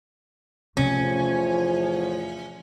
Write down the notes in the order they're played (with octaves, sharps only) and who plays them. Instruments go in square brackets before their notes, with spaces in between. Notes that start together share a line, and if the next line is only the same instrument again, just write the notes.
[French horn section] E2 A2 F3 [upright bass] C3 A3 [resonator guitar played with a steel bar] C#4